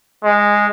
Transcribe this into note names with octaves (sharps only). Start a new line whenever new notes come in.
G#3